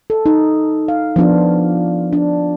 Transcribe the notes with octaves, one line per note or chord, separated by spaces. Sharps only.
A4
D#4
F5
F3 B3 D4 F4
D4